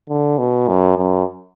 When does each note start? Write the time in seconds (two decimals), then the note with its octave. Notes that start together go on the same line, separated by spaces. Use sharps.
0.09 D3
0.38 B2
0.68 F#2
0.98 F#2